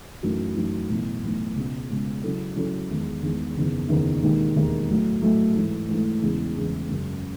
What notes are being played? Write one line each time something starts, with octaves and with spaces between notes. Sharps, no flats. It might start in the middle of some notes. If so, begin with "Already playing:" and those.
F#2 E3 A3 D#4 F#4
F#2 E3 A3 D#4 F#4
B1 A2 E3 A3
B1 A2 E3 A3
C#2 B2 G#3
C#2 B2 G#3
C#3 F#3 C#4 E4 A4
C#3 F#3 C#4 E4 A4
E2 D#3 G#3
E2 D#3 G#3
F#1 E2 D#3
F#1 E2 D#3
E1 D#2 D#3 G#3 D#4
E1 D#2 D#3 G#3 D#4
A2 F#3 A3
A2 F#3 A3
G#2 E3 A3
G#2 E3 A3
E2 C#3 E3 G#3
E2 C#3 E3 G#3
F#2 C#3 G#3